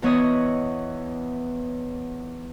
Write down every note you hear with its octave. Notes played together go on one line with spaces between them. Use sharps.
E2 E3 B3 C#5 D#5 D#6